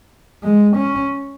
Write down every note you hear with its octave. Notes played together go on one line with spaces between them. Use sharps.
G#3
C#4